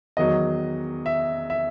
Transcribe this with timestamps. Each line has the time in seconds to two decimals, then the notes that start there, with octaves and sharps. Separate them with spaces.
0.17 E2 D#3 F#3 D#5
1.06 E5
1.50 E5